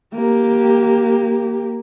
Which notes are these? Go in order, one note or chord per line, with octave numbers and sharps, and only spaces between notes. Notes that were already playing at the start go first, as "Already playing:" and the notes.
A#3 G4